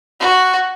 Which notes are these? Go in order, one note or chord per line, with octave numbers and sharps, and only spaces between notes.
F#4